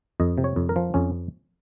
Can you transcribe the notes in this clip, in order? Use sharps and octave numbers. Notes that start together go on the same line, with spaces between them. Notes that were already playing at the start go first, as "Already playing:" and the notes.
F2 D#5
C3
C#5
F2
A#4
F3
F2 C#4